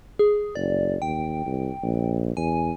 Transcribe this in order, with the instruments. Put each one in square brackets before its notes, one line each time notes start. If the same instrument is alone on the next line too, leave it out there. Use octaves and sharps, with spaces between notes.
[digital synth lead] G#4
[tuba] F#1 [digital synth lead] D5
[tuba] D#2 [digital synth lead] G5
[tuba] C2
A#1
[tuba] E2 [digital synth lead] G#5